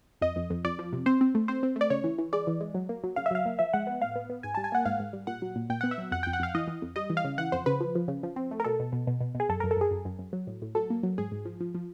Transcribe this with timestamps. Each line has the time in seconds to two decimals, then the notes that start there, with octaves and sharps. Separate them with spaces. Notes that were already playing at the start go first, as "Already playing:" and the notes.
0.22 F2 D#5
0.36 F2
0.50 F2
0.65 F2 D5
0.79 F3
0.93 C3
1.06 C4 C5
1.21 C4
1.35 A3
1.48 C4 C5
1.63 C4
1.76 A3 D5
1.90 C#3 C#5
2.04 E3
2.18 E3
2.33 G#3 D5
2.47 E3
2.61 G#3
2.74 F#3
2.89 A#3
3.04 F#3
3.16 C#3 F5
3.26 E5
3.31 F#3 F5
3.46 A#3
3.59 F3 E5
3.73 G#3 F#5
3.87 B3
4.02 A2 F5
4.16 B3
4.30 B3
4.43 G#2 G#5
4.55 G3 A5
4.64 G#5
4.72 A#3 F#5
4.85 G#2 F5
4.99 G#2
5.13 G3
5.27 A#2 F#5
5.42 F#3
5.56 A#2
5.70 A#2 G5
5.81 B3 F#5
5.91 E5
5.98 F#3
6.11 F2 F#5
6.23 F2 G5
6.33 F#5
6.40 F2 F5
6.54 E3 D#5
6.68 E3
6.82 F2
6.96 G3 D#5
7.10 E3
7.17 F5
7.24 C#3
7.38 E3 F#5
7.52 F2 C5
7.66 C#3 B4
7.80 F3
7.95 F3
8.08 C#3
8.23 F3
8.36 C4
8.51 A3
8.60 A#4
8.64 B2 A4
8.80 B2
8.92 B2
9.07 B2
9.21 B2
9.35 B2
9.40 G#4
9.49 F#2 A4
9.60 F#2 A#4
9.71 A4
9.77 F#2 G#4
9.91 F#2
10.05 F#2
10.19 F#2
10.33 F#3
10.47 A2
10.62 A2
10.75 F#3 A4
10.90 A#3
11.03 F#3
11.18 G#2 G#4
11.32 G#2
11.45 F3
11.61 F3
11.75 F3